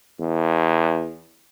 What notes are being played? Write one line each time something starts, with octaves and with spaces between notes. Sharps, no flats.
E2